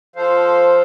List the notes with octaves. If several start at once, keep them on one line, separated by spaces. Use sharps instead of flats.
F3 A4 C5 F5